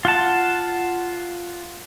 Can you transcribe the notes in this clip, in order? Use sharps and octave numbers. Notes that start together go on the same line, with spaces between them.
F4 F#5 A5